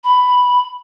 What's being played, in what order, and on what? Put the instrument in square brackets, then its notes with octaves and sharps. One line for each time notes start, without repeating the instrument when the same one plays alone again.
[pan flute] B5